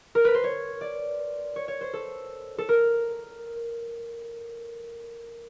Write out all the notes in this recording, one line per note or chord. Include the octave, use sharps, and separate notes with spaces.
A#4
B4
C5
C#5
D5
C#5
C#5
C5
A4
A4
A#4